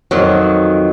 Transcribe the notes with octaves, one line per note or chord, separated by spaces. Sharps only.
F2 D#3 F#3